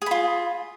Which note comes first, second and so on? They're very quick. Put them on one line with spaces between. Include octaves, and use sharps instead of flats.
G#4 B5 F4